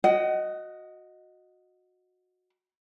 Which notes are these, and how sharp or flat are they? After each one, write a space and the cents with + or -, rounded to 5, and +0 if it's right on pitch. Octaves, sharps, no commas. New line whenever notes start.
F#4 -20 D#5 +0 F#5 +30